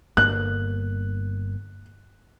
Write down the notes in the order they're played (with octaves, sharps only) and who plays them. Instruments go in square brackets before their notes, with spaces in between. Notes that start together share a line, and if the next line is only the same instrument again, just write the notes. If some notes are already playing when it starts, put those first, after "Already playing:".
[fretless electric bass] G1 G2 A#3 [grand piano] F#6